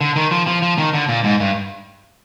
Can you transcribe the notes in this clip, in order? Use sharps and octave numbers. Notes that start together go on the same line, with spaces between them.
D3
D#3
F3
F3
F3
D#3
D3
A#2
G#2
G2